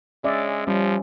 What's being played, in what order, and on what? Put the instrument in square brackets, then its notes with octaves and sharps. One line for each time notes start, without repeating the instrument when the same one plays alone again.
[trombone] G#3 [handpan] C#4 D5 E5
[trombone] F3 [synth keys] G3 [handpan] C#4